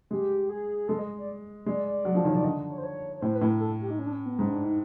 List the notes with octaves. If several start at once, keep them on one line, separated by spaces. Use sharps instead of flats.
G#3 G4
G#4
G#3 A4
D#5
D5
G#3 D5
D5
F#3
F3
D#3
C#5
D#3 D5
D3 D#5
C#5
C5
C#5
C#5
A2 C5
B4
A2
A#4
A4
G4
D#4
C#4
D4
C#4
B3
G#2 C#4
D4
D#4